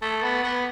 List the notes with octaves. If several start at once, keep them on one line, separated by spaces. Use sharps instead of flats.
A3
B3
B3